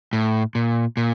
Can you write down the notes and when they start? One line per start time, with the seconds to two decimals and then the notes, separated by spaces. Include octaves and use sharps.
0.13 A2
0.55 A#2
0.97 A#2